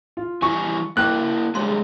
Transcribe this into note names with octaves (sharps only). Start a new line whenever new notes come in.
F4
E3 G3 E4 G#5 C#6
A#3 E4 A4 A#4 G5 D6 F#6
D3 G3 G#3 G#4 C#5 C6